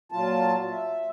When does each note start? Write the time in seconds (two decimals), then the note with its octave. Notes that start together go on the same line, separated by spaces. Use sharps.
0.12 A#2 F#3 F4 A5
0.71 E5